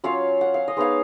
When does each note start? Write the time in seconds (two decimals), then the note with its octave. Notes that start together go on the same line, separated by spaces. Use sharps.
0.04 F#3 C#4 F4 C#5 F5
0.41 F#5
0.54 F5
0.68 D#5
0.77 G#3 B3 D#4 C#5 F5